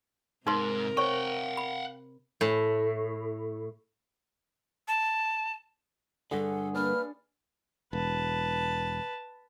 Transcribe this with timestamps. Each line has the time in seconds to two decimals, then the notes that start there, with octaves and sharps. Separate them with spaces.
0.47 G#2 C3 D#4 A#4 B4 C6
0.97 C5 C#5 F#5 G5 C#6
1.57 B5
2.41 A2
4.88 A5
6.31 G2 D3 G#4 A4 F#5
6.75 A#3 D4 B4 F6
7.93 E1 B4 A5